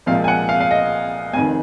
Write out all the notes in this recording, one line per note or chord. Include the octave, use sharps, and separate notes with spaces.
C2 A#2 F3 G#3 F5
G#5
F#5
F5
F5
D#5
F1 F2 D#3 G#5